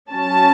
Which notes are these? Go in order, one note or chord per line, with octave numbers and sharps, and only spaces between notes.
F#3 C#4 A5